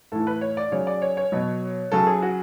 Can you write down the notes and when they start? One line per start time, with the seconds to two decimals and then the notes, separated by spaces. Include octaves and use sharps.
0.12 A2 E3 A4
0.27 B4
0.41 C#5
0.57 D5
0.72 C#3 F#3 C#5
0.87 D5
1.02 C#5
1.17 C#5
1.32 B2 F#3
1.92 C#3 F#3 A4
2.07 G#4
2.22 F#4